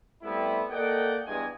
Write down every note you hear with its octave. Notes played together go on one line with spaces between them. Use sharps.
G3 A3 B3 C4 E4
A#3 A4 D5 D#5 F#5 G5
E2 G2 G#3 D#5 G#5